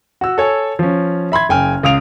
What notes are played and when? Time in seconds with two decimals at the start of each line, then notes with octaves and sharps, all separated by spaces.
0.21 F#4 E6
0.38 A4 C#5 G#5
0.79 F3 C#4
1.32 E5 B5 C6 G#6
1.49 F#1 G5 G#5 F6
1.83 C#2 F5 D#6 D7 F7